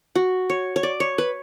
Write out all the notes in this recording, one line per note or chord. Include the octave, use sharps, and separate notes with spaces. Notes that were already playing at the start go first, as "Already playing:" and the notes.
F#4
C#5
C#5
D5
C#5
B4